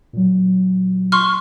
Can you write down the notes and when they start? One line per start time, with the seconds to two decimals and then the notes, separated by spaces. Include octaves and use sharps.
0.13 A#2 F#3
1.12 C6 C#6 F6